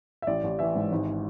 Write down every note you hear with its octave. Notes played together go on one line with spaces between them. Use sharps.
E5
A1 D5
A1
E3 E5
G#2
G#1